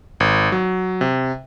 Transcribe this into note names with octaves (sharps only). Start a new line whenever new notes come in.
G#1
F#3
C3